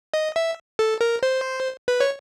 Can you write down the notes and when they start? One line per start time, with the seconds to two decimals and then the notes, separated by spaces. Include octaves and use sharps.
0.14 D#5
0.36 E5
0.79 A4
1.01 A#4
1.23 C5
1.88 B4
2.00 C#5